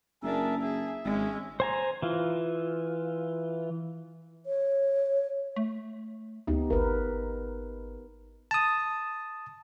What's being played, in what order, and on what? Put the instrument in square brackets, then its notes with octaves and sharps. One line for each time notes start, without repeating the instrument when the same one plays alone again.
[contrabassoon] F#1 [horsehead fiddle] D4 A5 [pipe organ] G#4 A#4 E5
[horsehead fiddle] G#4 [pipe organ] E5
[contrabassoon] G#1 [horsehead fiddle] G#3 C#4
[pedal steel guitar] C5 G#5 A#5
E3 F4
[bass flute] C#5
[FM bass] A3
[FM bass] D2 [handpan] B3 D#4 G4
[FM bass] G#1 [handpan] A#4 B4
[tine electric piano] A5 D#6